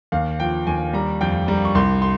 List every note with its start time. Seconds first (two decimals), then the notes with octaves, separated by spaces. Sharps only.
0.12 D#2 F5
0.40 F3 G5
0.67 D#2 G#5
0.93 G3 A#5
1.21 F2 G5
1.48 G3 A#5
1.65 C#6
1.75 C2 C6
2.02 C6